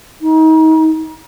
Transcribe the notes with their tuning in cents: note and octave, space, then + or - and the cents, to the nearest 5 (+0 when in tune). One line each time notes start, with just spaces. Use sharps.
D#4 +35